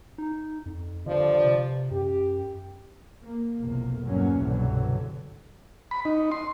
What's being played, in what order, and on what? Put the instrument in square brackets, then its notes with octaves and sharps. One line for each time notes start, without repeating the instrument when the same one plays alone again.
[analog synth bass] D#4
F2
[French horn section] G2 F3 D5 [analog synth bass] D3
[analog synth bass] C3
[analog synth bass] F#2 [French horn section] G4
[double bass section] A#3
F1 B1 E2 A#3
G1 E2 F#3 G3 A#3 C#4
C2 G2 B2 D3 E3 F#3
[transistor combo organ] B5
D#4
C6